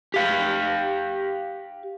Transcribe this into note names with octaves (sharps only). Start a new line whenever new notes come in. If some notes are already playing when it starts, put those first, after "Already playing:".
G4 F5